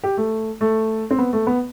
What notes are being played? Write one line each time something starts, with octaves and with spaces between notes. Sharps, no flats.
G4
A3
A3
C4
B3
A3
B3